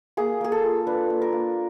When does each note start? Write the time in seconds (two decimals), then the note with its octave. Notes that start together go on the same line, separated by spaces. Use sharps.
0.17 A#3 G#4
0.41 A#3 G#4
0.52 A4
0.64 F4
0.87 D4 B4
1.10 A#3
1.22 A#4
1.33 A#3